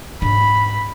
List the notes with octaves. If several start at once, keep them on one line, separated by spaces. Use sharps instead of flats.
G#2 D4 B5